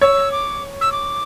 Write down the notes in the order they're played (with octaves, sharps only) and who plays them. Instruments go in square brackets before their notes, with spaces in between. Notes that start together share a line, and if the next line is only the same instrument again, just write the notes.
[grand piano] C#5 [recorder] E6
[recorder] D6
E6
D6